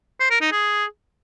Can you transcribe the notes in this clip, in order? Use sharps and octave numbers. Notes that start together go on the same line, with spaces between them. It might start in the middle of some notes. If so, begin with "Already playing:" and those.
C5
A#4
D#4
G#4